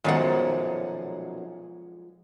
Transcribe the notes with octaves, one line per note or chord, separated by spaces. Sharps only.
B1 F#2 A#2 D#3 F3 G#3 B3 F#5